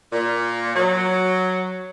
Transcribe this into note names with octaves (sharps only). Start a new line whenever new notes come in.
A#2
F#3